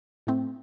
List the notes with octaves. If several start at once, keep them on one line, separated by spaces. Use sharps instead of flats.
A2 A3 C4